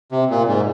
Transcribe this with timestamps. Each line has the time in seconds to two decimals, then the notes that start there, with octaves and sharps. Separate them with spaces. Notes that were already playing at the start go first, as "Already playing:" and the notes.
0.12 C3
0.30 A#2
0.48 G#2